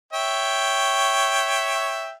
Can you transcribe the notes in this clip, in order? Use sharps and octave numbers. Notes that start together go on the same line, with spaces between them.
C#5 E5 G5